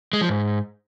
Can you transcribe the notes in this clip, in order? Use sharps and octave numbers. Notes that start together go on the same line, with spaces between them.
G#3
F3
G#2